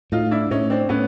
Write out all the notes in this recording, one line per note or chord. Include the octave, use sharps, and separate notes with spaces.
A2 D#4 F4
D4 E4
A2 C#4 D#4
C4 D4
A2 B3 C#4